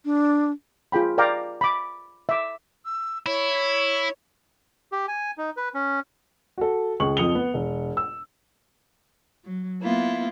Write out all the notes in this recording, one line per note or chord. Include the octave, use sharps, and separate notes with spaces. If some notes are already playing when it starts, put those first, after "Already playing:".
D4
F4 G#4 G5 B5
A#4 D5 F5 G5 A#5 D6
B5 D6
E5 D6
E6
E4 C#5
G4
G#5
D#4
B4
C#4
F#4 A4
C#2 G#4 C#6 F#7
F2 F3 D#6 C#7 F7 G7
B3
E1
E6
F#3
A#3 B3 E4 F4